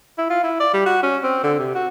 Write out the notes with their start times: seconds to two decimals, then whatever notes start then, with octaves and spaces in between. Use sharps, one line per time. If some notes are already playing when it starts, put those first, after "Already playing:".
0.18 E4
0.30 F4
0.43 E4
0.60 D5
0.73 G3
0.86 F#4
1.03 C#4
1.23 C4
1.43 D3
1.59 C3
1.75 F#4